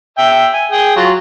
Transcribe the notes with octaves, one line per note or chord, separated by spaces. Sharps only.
E5 G5
G#5
G#4 G5
F#3 F4